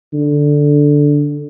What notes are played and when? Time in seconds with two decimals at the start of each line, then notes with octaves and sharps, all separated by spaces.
0.13 D3